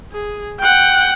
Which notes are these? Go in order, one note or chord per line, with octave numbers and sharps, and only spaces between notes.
G#4
F#5 G5